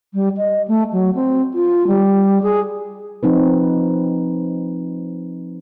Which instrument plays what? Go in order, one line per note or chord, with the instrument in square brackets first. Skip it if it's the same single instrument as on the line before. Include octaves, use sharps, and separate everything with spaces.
[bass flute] G3
D#5
A3
F#3
C4
F4
G3
G#4
[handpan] F3 C4 D#4 B4